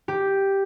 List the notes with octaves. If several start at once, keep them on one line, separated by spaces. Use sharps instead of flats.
G4